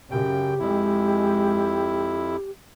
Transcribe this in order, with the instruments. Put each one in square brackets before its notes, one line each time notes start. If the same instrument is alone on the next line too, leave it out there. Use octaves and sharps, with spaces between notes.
[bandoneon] F#2 G5 [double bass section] C#3 [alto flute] G4
[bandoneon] F2 E4 [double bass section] G#3